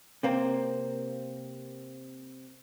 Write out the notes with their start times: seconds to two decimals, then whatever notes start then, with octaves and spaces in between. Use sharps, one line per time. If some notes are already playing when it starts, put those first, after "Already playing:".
0.23 C3 A#3 C4